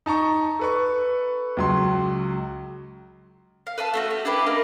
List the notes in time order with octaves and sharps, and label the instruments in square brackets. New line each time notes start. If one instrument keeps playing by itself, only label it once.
[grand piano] D#4 A5 A#5 C#6
A4 B4 C#6
C#2 F#3 C6
[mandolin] F5
B4 E5 F5 A5
A3 D#4 F#4
G4
D4 E4 G4 B4
A#3 A#4 D#5